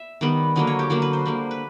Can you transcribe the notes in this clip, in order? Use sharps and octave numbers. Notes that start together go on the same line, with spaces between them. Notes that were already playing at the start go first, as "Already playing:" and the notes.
Already playing: E5
D#3 G3 B3
D3 F#3 A#3 D#5
C#5
G4
D3 F#3 A#3 F#4
B4
C5
D3 G3 A#3
B4